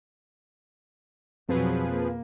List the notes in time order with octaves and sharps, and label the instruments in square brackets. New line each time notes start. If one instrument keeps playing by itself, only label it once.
[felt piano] F2 [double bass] B2 F#3 [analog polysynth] F3 G#4 B4
[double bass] A#3